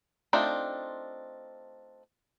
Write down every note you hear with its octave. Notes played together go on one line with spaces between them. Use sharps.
A3 C4 D4 D#4 F4